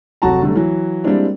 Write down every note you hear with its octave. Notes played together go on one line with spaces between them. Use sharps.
F1 F#3 F#4 A5 A#5
D3 F#3 G3 A3
E3 F#3
G3 G#3 A#3 C4 D4 E4